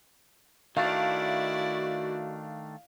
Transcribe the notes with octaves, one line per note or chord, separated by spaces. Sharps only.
D#3 A3 D4 E4 F#4 D5 F5